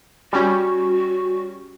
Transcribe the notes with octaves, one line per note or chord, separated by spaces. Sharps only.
G3 C#4 F#4